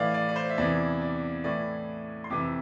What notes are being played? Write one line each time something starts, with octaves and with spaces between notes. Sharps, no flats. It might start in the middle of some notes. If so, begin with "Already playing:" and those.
Already playing: A2 E3 D5 F5
D5
D5
C5
E5
E2 C3 E3 D5
D5
A2 E3 D5
C6
F2 C3 E3 D6